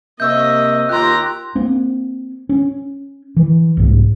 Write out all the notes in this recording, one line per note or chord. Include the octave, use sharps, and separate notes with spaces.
C3 A#3 D#5 E5 C#6 E6 G6
D#2 A#3 F4 G4 D#5 A#5 C6 F#6
A#3 C4
C#4
E3
C2 G#2